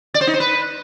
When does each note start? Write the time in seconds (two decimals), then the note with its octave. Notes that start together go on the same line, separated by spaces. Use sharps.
0.14 D5
0.21 C5
0.27 D#4
0.34 C5
0.40 B4